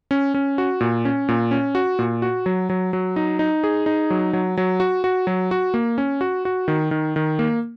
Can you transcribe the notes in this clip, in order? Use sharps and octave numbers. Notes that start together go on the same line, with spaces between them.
C#4
C#4
F#4
A#2
C#4
A#2
C#4
F#4
A#2
F#4
F#3
F#3
F#3
D#4
D#4
G#4
D#4
F#3
F#3
F#3
F#4
F#4
F#3
F#4
A#3
C#4
F#4
F#4
D#3
D#3
D#3
A#3